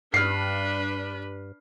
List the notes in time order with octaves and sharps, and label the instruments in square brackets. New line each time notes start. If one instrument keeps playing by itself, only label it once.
[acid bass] G2 [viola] D4 B4 [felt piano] F6 C7